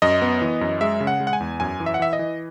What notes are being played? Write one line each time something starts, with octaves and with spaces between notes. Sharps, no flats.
F#2 D#5
B3
E3
F#2
G#3 E5
C#3
F#5
G#3
F#5
G#5
E2
F#2 G#5
E3
E5
F#5
E3 E5
D#5
E3